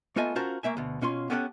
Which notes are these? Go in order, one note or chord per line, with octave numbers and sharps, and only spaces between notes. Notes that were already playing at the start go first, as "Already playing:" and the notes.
A3 B3 F4 A4 D#5 G#5
C#4 F4 F#4 A#4 C5 A5
A3 A#3 E5 G#5
D2 B2
B2 C#4 F4 C6
B3 C#4 G4 A4 D5 F#5